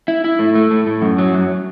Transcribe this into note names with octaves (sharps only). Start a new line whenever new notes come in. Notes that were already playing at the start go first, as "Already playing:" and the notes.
E4
E4
A2
A3
A2
A2
F#2
F#3
F#2